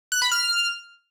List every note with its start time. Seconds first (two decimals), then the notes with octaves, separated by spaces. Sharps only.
0.12 F#6
0.22 B5
0.32 F6